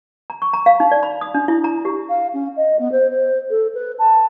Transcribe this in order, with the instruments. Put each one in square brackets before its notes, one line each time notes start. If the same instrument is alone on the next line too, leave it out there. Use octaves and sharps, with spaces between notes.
[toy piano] A#5
C#6
A#5
F5
D#4
D5
B5
D#6
D4
E4
A#5
G4
[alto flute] F5
C#4
D#5
B3
C5
C5
A4
B4
A5